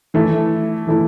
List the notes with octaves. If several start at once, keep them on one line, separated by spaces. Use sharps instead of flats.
E3 A3 E4
E3 A3 E4